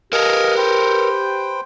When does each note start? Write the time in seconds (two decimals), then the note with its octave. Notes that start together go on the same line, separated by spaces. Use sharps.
0.13 G4 A4 A#4 D#5 F5 G#5
0.57 B4 C5 G5